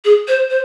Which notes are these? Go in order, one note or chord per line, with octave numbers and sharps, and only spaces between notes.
G#4
C5
C5